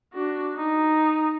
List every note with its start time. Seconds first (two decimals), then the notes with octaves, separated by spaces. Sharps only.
0.13 D4 F#4
0.55 D#4